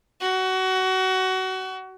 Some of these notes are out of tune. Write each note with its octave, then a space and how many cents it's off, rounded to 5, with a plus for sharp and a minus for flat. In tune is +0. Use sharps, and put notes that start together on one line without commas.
F#4 +25